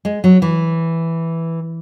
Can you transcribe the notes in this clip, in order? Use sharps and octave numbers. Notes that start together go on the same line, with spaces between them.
G#3
F#3
E3